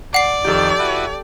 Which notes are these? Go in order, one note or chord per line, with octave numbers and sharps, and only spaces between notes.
D5 F#5 C7
F2 D#3 G4 A4
E4 F#4 B4